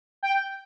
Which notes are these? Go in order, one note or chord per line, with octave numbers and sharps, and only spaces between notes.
G5